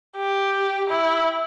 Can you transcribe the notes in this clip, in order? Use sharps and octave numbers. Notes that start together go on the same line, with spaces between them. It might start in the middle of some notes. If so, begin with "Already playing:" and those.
G4
E4